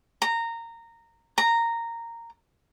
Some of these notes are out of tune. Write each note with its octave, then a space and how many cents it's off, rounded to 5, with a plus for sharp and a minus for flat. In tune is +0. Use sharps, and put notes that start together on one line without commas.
A#5 -15
A#5 -10